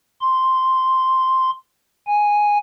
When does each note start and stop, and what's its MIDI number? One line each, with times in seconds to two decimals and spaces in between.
0.21 1.50 84
2.07 2.58 80